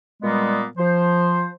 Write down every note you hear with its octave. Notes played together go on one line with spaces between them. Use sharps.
A#2 G3 G#3 A#3 B3
F3 C5